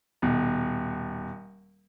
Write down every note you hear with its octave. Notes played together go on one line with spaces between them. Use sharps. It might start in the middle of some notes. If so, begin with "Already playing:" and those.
D#1 B2